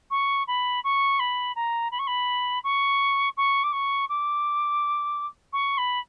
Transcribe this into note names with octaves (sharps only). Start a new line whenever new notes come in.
C#6
B5
C#6
B5
A#5
B5
C#6
B5
C#6
C#6
D6
C#6
D6
C#6
B5